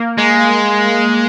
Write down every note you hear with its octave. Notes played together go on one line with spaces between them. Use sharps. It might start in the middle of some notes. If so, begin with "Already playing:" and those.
Already playing: A#3
G#3